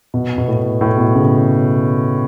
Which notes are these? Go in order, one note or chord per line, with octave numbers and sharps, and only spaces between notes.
B2
B2
A2
A2
B2
C#3